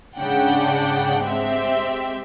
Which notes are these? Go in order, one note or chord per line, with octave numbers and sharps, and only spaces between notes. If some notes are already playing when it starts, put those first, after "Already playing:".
G#2 C#3 D4 F#5 G5 A5
G#3 C4 G4 E5